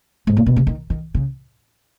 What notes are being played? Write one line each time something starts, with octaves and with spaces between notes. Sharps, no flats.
G#2
A#2
B2
C#3
D#3
D#3
C#3